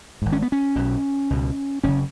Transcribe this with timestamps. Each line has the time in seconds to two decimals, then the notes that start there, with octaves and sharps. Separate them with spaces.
0.22 G#1 G#2
0.32 C#4
0.42 B3
0.52 C#4
0.76 B1 B2
1.30 C#2 B2
1.84 F#1 C#3 C#4